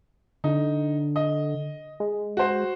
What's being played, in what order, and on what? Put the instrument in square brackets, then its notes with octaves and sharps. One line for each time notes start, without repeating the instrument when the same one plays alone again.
[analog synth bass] D3 [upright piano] D#4
[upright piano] D#5
[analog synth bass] G#3
[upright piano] F#4 C5